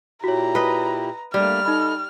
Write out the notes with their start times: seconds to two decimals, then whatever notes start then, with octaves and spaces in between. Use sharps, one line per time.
0.24 A#2 E4 F#4 G4 C#5 A#5
0.55 B4 D#5
1.34 G3 A3 A#3 D4 D5 F6
1.65 D#4 A4 D#5 B5